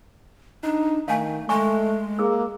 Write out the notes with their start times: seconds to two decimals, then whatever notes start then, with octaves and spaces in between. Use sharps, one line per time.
0.64 D4 D#4
1.08 D#3 A3 F5 G#5
1.49 G#3 A3 G#5 C#6
2.19 A#3 G#4 E6